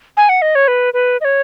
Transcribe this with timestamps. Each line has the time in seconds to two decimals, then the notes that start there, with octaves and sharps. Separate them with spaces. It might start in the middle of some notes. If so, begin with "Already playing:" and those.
0.17 G#5
0.29 F#5
0.42 D#5
0.55 C#5
0.68 B4
0.94 B4
1.21 D#5
1.25 C#5